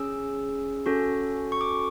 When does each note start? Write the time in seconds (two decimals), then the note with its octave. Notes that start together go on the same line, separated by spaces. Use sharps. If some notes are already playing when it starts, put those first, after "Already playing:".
Already playing: C#4 G#4 E6
0.86 C#4 F#4 A4
1.52 C#6
1.61 D6